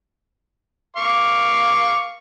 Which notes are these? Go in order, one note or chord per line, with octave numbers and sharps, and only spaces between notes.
F5 C#6 D6